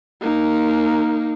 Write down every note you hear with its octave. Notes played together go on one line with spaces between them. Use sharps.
A#3 D#4